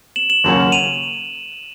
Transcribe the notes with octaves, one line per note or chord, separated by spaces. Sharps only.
E7 F#7
E7 F#7
D#2 C#3 F#3 A#3 C#4
D#7 F7